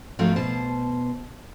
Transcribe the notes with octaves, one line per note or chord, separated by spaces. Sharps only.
G#2 F3 A3 C4 F4 F#4
B2 C5 A5